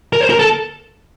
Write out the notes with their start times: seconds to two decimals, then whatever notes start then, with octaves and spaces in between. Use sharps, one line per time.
0.13 A#4
0.21 C5
0.30 A#4
0.39 A4